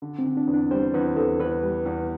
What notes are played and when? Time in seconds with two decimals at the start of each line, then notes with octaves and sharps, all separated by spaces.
0.02 D3
0.19 C4
0.25 D3
0.37 D4
0.47 E2
0.54 D4
0.71 G3 C5
0.94 E2 B4
1.16 E2 A4
1.40 E2 B4
1.63 G3
1.86 E2